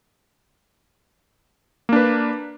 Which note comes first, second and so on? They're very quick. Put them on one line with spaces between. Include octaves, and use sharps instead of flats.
A#3 D4 B4